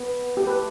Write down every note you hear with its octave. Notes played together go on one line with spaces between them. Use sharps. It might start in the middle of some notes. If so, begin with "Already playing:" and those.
Already playing: B3
A3 G4
B4